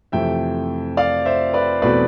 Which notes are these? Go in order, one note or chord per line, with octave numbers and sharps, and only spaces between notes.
F2 C3 E3 A3 E5 G5
D5 F5
C5 E5
B4 D5
E2 B2 A3 C4 B4 D5